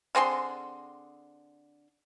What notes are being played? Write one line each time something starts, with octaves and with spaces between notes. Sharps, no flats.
D3 C4 G#4 C6